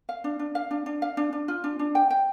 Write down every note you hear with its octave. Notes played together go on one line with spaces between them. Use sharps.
F5
D4
D4
F5
D4
D4
F5
D4
D4
F4
D4
D4
G5
G5